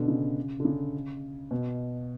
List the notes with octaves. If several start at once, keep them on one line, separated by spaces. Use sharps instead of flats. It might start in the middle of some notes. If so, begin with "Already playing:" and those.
Already playing: B2 D3
C#3
D3
C#3
B2